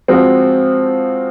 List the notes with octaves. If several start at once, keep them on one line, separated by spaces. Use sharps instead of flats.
F3 G#3 C4 F#4